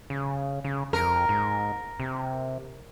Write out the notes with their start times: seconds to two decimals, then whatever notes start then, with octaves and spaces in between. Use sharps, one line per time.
0.10 C#3
0.64 C#3
0.93 F2 A#4
1.29 G#2
2.00 C3